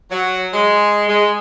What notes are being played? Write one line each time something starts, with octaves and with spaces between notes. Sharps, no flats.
F#3
G#3
G#3